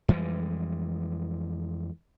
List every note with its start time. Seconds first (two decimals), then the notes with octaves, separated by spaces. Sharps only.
0.08 F2 E3 G3 G#3